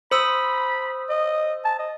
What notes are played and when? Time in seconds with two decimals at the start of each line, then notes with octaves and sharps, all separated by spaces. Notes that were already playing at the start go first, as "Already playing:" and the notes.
0.11 C5 B5 D#6 E6
1.09 D#5
1.65 A5
1.79 D#5